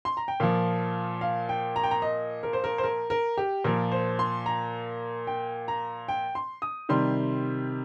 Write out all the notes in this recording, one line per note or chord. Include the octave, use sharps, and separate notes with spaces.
C6
A#5
G5
A#2 F3 F5
F5
G5
A#5
G5
A#5
D#5
A#4
C5
A#4
C5
A#4
A#4
G4
A#2 F3 A#4
C5
C6
A#5
G5
A#5
G5
C6
D#6
C3 D#3 G3 C6